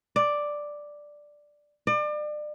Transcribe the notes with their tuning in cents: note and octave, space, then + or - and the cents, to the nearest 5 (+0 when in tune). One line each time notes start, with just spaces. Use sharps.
D5 +5
D5 +35